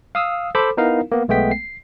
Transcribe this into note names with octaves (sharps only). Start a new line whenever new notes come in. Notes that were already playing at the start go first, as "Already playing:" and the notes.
F5 D#6 E6
A4 C5 B5 D6
B3 D#4 E4 A#4 F5
A#3 B3
B1 G#3 A3 B3 G5 B6
C7